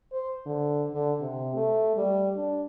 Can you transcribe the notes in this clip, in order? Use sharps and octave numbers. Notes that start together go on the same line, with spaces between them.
C5
D3
D3
C3
A3
G3
D4